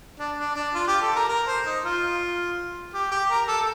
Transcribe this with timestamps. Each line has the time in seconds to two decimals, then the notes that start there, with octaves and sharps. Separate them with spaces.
0.19 D4
0.38 D4
0.56 D4
0.75 F4
0.87 G4
1.02 A4
1.16 A#4
1.29 A#4
1.47 C5
1.66 D#4
1.84 F4
2.94 G4
3.12 G4
3.30 A#4
3.48 A4